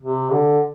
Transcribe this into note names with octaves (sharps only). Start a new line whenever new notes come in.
C3
D3